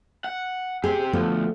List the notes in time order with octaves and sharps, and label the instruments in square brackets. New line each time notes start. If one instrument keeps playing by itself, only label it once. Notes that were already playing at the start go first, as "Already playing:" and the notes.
[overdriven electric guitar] F#5
[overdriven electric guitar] C4 G4 [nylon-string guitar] G#4
[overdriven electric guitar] D2 [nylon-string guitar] F3 A3 B3